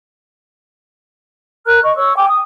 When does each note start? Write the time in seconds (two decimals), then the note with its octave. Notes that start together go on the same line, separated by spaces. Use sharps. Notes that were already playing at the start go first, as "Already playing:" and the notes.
1.66 A#4 A#5 F6 F#6
1.83 D#5 C#6
1.97 C#5 C#6 E6
2.16 G5 G#5 D6
2.28 D#6